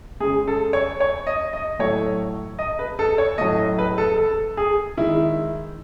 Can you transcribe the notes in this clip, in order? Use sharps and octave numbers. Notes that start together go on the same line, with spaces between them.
C#3 G#3 G#4
A4
C#5
C#5
D#5
D#5
A2 F#3 A3 C#5
D#5
B4
A4
C#5
A2 F#3 A3 D#5
D#5
B4
A4
A4
G#4
D#3 G#3 E4